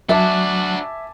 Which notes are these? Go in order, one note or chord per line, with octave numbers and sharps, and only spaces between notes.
F#3 D4 F#4 E5 G#5 A5 D6